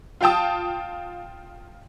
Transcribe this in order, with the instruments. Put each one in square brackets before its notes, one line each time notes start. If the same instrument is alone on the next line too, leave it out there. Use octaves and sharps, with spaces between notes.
[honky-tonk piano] F4 F5 G5 A5 D#6